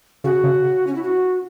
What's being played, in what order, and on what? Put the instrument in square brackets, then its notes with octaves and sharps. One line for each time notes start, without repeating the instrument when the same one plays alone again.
[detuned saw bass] C#3 [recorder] F#4
[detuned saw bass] C#3
[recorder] C#4
E4
F#4